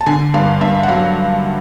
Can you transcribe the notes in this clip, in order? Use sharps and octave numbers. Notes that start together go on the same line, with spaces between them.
A5
D3 G#5
G2 F5
G2 E5
F#5
F#3 F5